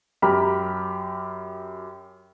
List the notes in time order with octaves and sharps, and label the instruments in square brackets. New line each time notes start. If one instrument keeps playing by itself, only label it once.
[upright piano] F#2 G4 A#5 B5 F6